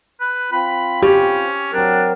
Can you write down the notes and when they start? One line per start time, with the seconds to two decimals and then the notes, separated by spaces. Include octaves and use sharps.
0.20 B4
0.52 C4 F4 B5
1.02 C#4 G4
1.73 F#3 C4 D4 A#4